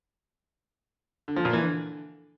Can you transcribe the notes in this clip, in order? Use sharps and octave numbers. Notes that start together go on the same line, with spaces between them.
D3
F3
A#2
E3
D3